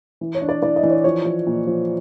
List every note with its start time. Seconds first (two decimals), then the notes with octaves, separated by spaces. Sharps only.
0.21 E3
0.35 C#5
0.42 D4
0.49 D5
0.62 E3 D5
0.76 D#5
0.83 E3
0.90 C#5
1.04 F3 C#5
1.25 F3
1.47 A#2
1.67 F3